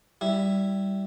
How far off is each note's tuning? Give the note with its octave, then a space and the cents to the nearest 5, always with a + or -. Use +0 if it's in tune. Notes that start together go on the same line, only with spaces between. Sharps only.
G3 -5 E4 +5